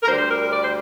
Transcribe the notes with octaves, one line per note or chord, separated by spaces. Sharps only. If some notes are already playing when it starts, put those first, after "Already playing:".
A#4
D2 D3 G3 C5
C5
A#4
A#4
D5
C5